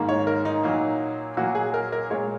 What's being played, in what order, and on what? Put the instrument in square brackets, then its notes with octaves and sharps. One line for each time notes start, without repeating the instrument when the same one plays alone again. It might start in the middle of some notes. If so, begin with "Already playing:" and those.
Already playing: [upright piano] G#2 D#3 A#3
C#5
A#4
D#4
A#2 F#3 A#3
A#2 F#3 A#3 F#4
G#4
A#4
A#4
A#2 G#3 C#5